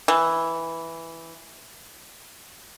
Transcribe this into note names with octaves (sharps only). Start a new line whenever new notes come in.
E3